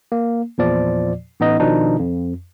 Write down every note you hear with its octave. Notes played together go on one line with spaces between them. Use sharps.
A#3
E2 A#2 F3 D5
A1 B3 D#4 D#5
B2 D#3 F3 D4 D#4
F2